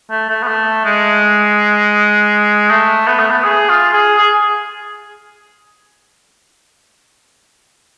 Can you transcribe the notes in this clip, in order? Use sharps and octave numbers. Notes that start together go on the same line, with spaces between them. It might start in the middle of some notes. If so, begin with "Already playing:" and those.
A3
A3
B3
A3
G#3
A3
B3
A3
B3
G#4
F4
G#4
G#4